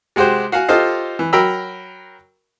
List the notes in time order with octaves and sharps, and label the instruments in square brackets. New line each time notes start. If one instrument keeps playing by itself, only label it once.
[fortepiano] C3 G#3 F#4 G4 C5
F#4 F5 F#5 G#5
F4 G4 A4 C5 D#5 F5
E3
F#3 A#4 G5 A#5 B5 E6